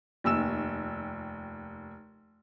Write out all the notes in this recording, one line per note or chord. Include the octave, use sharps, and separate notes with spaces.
F1 D#2 E6 E7